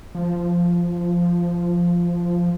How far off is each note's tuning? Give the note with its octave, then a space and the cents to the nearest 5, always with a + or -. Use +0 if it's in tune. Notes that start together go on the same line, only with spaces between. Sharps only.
F3 -5